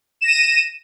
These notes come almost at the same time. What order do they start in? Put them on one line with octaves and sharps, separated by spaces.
E7 A#6 D#7